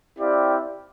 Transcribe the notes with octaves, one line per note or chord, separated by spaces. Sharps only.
C4 E4 G4 D5 F5